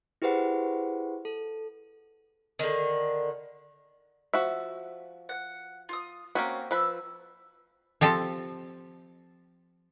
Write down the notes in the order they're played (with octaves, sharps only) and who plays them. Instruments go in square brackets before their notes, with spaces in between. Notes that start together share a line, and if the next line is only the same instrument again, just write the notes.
[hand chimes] E4 G4 G#4 B4 C5 F#5
A4
[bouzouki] D3 D#3
[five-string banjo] F3 F#4 E5
[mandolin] F#5
F4 D#6
[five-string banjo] A#3 C4 F#4 [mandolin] C#4
[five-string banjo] F3 B4 [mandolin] E6
[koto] F3 C4 G4 A4